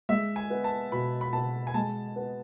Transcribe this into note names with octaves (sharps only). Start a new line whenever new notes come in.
G#3 E5
G#5
B3
A5
B2 B5
B5
B2 A5
G#5
G#3 A5
B3